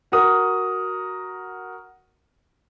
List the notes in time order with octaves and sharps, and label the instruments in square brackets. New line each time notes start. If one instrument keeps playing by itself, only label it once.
[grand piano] F#4 A#4 F#5 D#6